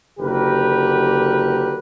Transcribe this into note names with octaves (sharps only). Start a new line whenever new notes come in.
F#1 D3 G4 A#4 B4